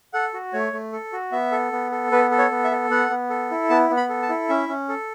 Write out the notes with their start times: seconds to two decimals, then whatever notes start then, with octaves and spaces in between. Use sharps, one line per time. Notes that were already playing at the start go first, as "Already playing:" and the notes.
0.14 A4 F#5
0.34 F#4
0.53 A3 C#5
0.73 A3
0.92 A4
1.13 F#4
1.32 B3 E5
1.52 A4
1.72 B3
1.91 A4
2.12 B3 B4
2.31 A4
2.38 C#5
2.51 B3
2.64 E5
2.71 A4
2.90 B3 F#5
3.10 B3
3.30 A4
3.51 E4
3.70 B3 A5
3.90 B3
3.97 B5
4.09 A4
4.22 A5
4.29 E4
4.49 C#4 E5
4.68 C#4
4.89 A4